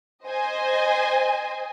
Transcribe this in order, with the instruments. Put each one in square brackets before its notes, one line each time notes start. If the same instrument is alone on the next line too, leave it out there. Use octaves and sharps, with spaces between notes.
[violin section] C5 D#5 G#5